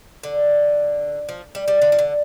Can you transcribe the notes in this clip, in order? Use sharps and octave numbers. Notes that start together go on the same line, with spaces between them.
D3
F3
G3
G3
D3
F3
D3